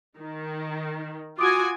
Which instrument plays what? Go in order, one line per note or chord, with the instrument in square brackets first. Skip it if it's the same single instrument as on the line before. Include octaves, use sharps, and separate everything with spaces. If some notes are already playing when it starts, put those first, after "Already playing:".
[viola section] D#3
[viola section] F4 F#4 G#5 [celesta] D6 D#6 D7